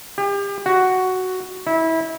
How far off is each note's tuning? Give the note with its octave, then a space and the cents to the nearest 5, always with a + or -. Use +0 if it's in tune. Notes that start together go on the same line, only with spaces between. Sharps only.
G4 +35
F#4 +5
E4 -25